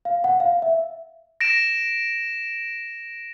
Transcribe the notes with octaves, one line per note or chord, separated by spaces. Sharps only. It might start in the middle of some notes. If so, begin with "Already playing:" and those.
F5
F#5
F5
E5
A#6 D7 E7